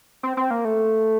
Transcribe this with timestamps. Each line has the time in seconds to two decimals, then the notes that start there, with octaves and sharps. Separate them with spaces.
0.23 C4
0.37 C4
0.51 A#3
0.65 A3